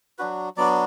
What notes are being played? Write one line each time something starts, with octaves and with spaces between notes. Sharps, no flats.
F#3 D4 F#4 B4
F#3 B3 D4 F#4 D5